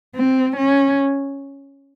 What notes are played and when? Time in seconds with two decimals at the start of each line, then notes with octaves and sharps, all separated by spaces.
0.15 C4
0.56 C#4